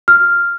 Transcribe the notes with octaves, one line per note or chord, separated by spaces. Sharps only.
F6